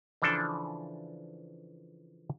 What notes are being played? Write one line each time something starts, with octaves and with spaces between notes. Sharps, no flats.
C#3 E3 F3 D4 A4